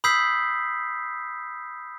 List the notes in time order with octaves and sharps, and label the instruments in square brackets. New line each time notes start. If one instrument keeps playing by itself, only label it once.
[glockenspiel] B5 D#6 E6 G6 B6 C7